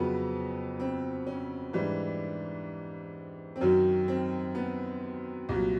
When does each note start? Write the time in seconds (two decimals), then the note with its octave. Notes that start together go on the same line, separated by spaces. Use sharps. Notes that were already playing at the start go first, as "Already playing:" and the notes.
Already playing: F2 C#3 F#3 B3
0.80 C4
1.27 C#4
1.73 G#2 E3 G3 D4
3.56 C4
3.61 F#2 D#3 F#3 C#4
4.08 C4
4.55 B3
5.49 C2 A#2 F#3